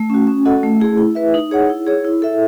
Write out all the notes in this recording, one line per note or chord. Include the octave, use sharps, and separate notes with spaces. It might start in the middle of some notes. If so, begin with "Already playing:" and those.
Already playing: A3
C#4 F#4
C#4
F#4 A4 D#5 F#5
A3
E4 G#4
E4
B4 E5
D#4
G#4 C#5 F#5
E4
G#4 C#5
E4
A4 E5